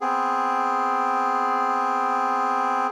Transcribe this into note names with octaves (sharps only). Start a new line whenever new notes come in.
B3 C4 G#4